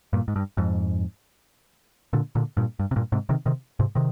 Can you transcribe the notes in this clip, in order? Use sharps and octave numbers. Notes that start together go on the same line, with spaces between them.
G2 A#2
G#2
G2
F2 G#2
A#2 D3
A#2 D3
G2 A#2
G2
C3
G2 A#2
G#2 C3
C3 D#3
C3 D#3
G#2 C3
C3 D#3